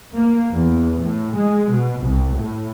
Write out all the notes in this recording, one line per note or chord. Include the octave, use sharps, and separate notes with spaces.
A#3
E2
A2
G#3
B2
C2
A2